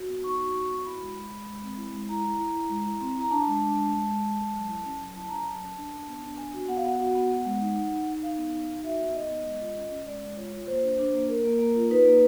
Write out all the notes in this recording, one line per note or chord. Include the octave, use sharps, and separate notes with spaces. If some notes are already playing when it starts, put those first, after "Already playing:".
Already playing: F#4
B3
D#4 C#6
F#4
B3
F#4
E4 B5
G#3
G#3
G#3
G#3
C4
E4
G#3
E4 A#5
E4
E4
E4
G#3
E4
C4
E4 A#5
D4 A5
G#3
D4
G#3
G#3
G#3
G#3
G#3
F#3
E4
C#4
F#3
E4 A5
C#4 A#5
F#3 A5
C#4
D4
D4
B3
D4
B3 G#5
F#4
B3 F#5
F5
B3 F#5
F#4
B3
B3
G#3
D#4
D#4
D#4
D#4
D#4 F5
B3
D#4
D#4
F#4 E5
B3
D#4 D#5
B3
G#3
F4
C#4
C#4
G#3 D5
G#3
F4 C#5
F4
A#3 C5
D4
D4
A#3
A#3 A#4
A#3
A#3
F4
D#4 B4
A#3